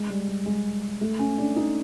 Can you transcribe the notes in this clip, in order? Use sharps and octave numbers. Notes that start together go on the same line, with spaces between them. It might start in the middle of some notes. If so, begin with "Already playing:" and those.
Already playing: G#3
G3
G3
G#3
A3
C#4
D4
D#4